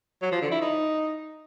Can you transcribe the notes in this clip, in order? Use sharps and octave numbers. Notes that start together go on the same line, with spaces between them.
F#3
F3
D3
E4
D#4